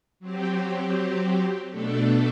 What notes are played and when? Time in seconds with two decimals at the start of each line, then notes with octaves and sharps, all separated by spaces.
0.20 F#3 C4 G4
1.71 B2 A3 D4 A4